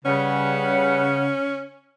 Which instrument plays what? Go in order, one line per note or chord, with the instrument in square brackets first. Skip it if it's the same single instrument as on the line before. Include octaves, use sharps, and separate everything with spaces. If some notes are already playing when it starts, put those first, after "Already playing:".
[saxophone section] C#3 [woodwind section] G3 B4 F#5 [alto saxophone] C#4